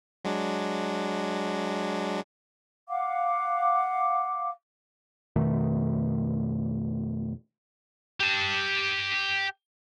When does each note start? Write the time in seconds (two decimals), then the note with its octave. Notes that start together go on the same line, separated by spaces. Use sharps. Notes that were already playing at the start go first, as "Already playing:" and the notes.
0.25 F#3 G#3 D4
2.88 F5 F#5 D6
5.36 F2 B2 D#3 A3
8.20 G4 A5